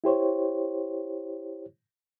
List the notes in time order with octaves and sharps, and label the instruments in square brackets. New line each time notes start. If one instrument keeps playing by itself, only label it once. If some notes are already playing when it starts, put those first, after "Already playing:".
[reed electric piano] E4 G4 C5 C#5